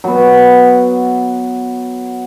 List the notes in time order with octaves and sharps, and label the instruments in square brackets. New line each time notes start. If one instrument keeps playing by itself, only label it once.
[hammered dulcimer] F#3 B3